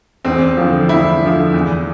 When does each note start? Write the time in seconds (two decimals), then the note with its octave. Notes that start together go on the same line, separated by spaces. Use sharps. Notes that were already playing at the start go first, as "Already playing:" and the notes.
0.25 E2 C4
0.57 D3 F3
0.89 E2 E4
1.22 D3 F3
1.54 E2